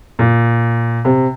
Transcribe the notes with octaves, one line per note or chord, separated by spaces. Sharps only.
A#2
C3